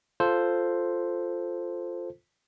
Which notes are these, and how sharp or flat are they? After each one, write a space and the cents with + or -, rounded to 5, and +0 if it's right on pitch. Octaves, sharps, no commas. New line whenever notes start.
F4 +0 A4 +0 C5 +0